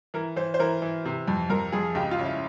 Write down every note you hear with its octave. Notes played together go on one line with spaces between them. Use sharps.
E3 A#4
E3 C5
C5
E3 A#4
E3
C3
F2
F2 A#4
F2 G#4
C#2 G4
F4
C#2 C#4
E4